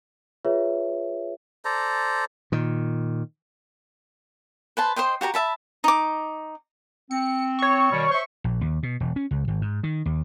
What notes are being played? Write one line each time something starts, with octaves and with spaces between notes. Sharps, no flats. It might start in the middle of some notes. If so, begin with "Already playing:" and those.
F4 G#4 B4 C#5 E5
A4 C5 D5 A#5
A#2 D#3
B4 C5 A5
C5 D#5 G5 C6
F#4 G4 A5 A#5
E5 A5 B5
D#4 D6
C4 C#7
C#5 C#6
B2 D#3 G3
C5 E5 C#6
A#1
D#2
B2
E1
C#4
C#2
G#1
G#2
D#3
D#2